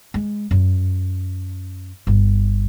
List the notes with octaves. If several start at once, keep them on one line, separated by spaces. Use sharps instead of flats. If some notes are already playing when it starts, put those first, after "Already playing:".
G#3
F#2
G1